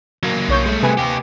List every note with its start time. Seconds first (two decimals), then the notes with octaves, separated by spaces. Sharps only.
0.23 F#3 A#3
0.48 B1 C#5 G6
0.66 G#3 A3
0.83 C3 B4 G#5
0.98 A#3 G4